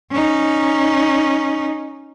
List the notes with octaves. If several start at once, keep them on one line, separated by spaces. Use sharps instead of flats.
C#4 D#4